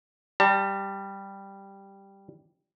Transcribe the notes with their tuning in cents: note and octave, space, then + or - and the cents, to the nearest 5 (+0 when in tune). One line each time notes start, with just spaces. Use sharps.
G3 +0 A5 +35